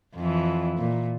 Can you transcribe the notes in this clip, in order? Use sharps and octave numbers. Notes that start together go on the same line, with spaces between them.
F2 E3
A#2